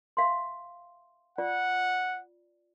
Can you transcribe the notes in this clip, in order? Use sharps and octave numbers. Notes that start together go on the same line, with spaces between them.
E5 F5 C6
F4 D5 F#5